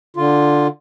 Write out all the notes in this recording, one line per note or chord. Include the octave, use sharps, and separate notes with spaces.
D3 F4